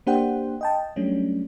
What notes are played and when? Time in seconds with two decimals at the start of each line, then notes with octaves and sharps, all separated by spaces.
0.07 A#3 D4 G4 C5 F#5 G5
0.61 D#5 G5 A5
0.96 F#3 G3 A3 C#4 D4